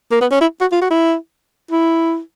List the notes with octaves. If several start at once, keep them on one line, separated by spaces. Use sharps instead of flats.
A#3
B3
C#4
E4
F#4
F4
F#4
E4
E4